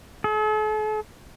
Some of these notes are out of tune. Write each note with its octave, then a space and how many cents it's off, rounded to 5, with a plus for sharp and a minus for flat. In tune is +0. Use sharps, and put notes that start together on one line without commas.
A4 -45